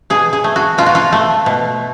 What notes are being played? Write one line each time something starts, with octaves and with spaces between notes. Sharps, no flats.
B2 G#4
G#4
A3
F#4
B2 F4
F#4
F4
A3
B2